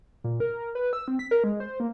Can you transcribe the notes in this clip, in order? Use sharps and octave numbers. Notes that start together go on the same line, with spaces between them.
A#2
A#4
A#4
B4
E6
C4
B6
A#4
G#3
C5
A#3